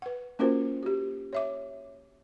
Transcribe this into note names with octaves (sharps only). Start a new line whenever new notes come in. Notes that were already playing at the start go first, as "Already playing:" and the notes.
B4 F#5
A#3 C#4 F4 F#4 A#4 C5
F#4 G4
C#5 E5 D6